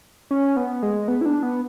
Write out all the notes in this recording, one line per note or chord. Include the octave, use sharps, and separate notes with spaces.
C#4
B3
G#3
B3
E4
D4
B3